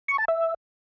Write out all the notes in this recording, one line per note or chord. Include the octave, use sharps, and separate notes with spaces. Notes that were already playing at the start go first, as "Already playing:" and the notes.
C#6
A5
E5